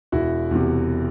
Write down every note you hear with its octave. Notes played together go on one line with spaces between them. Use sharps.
E1 E4 F#4
E2 C3